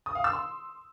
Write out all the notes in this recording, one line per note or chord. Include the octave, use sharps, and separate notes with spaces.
D#6
F5
E6
C6